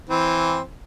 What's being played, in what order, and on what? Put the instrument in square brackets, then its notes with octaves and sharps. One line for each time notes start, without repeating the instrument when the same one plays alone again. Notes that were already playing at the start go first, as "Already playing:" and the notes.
[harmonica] E3 C4